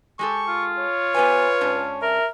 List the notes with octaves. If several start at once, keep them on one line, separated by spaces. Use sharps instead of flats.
G#3 G4 A4 C#6
F4
C#5
B3 G4 B4 G#5
G#2 C#4 D4
A#4 E5